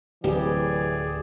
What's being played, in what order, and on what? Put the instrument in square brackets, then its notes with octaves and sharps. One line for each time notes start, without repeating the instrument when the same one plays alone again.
[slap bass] D1 [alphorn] E3 [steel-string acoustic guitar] G4 [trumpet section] G#4 D5